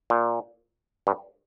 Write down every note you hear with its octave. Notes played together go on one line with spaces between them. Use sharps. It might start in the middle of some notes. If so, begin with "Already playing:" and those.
A#2
G2